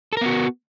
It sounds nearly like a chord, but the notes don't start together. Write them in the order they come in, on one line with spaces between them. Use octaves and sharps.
A4 A#4 B3 F#4